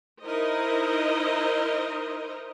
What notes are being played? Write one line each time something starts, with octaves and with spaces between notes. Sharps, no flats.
D#4 E4 A#4 C5 D#5